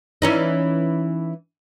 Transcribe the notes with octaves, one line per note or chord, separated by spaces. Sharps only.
E3 C#4 D#4